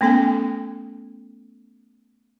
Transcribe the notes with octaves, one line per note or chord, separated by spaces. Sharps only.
A3 B3 C#4 A4 G5 G#5